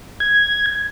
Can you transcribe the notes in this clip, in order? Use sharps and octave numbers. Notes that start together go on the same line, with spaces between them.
G#6